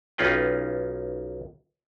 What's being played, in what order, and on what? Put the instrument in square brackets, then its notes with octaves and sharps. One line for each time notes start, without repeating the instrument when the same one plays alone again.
[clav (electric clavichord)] B1 C#4 D#4 F4 B4 G5